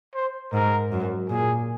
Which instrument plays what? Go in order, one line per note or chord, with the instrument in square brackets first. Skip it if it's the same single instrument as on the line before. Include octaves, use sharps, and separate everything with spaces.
[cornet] C5
[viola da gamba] G#2 [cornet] A#4
[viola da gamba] F#2
[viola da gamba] A#2 [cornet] G#4